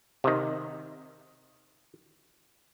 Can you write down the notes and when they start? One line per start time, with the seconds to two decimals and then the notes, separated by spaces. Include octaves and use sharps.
0.24 C3 D#3